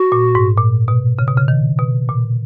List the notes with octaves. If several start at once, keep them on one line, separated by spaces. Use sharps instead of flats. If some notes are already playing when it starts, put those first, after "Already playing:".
Already playing: F#4
A#2
G#2
A#2
B2
C#3
B2
C#3
D#3
B2
A#2